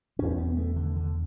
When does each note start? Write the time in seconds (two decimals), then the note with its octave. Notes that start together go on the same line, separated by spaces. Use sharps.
0.19 B2 C#4
0.22 E2
0.31 C#4
0.38 B3
0.57 A3
0.76 D3
0.96 D3